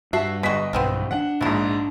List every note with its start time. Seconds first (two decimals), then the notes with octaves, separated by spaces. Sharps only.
0.13 G2 F#4 E5 A5 C7
0.43 G1 G#3 F#4 D#5 B6
0.73 B1 G2 B3 C4 F4
1.11 D3 D4 F#5
1.41 A#1 G#2 E4 F#4